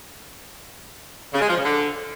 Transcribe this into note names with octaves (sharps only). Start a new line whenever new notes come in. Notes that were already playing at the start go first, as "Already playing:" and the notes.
C#3
G#3
F3
C#3
D3